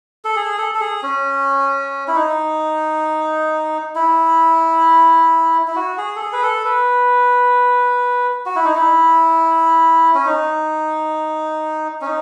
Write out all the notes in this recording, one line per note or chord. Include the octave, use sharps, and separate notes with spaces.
A4
G#4
A4
A4
G#4
C#4
E4
D#4
E4
E4
F#4
G#4
A4
G#4
B4
A4
B4
F#4
E4
D#4
E4
C#4
D#4
C#4
D#4